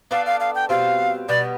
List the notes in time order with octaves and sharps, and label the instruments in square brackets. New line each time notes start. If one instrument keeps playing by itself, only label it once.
[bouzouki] B3 D4 A4 D5 [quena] F5
[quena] F5
F5
G5
[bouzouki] B2 G3 C4 F4 [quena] F5
[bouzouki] B2 G3 B3 [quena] D5